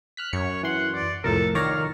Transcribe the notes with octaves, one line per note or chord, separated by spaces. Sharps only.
F6 F#6 B6
F#2 C#5 C#7
E3 F#5 C6
D5
C2 F2 A2 A4 A#4
D#3 C#5 D5 F5 A#5